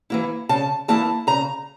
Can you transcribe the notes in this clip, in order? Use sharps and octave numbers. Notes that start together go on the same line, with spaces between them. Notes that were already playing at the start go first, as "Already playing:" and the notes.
E3 A#3 E4
C#3 A5
E3 A#3 E4 A5
C#3 A#5